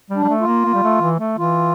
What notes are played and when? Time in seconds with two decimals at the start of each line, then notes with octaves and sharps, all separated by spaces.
0.10 G3
0.16 D4
0.24 G3
0.28 A3
0.40 F4
0.47 A#3
0.65 A#3
0.75 G3
0.83 A3
1.01 E3
1.20 A3
1.38 E3 F4